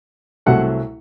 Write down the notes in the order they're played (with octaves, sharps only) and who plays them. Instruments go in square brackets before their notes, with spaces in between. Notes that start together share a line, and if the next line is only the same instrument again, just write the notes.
[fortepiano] C2 C3 F#3 A3 F#5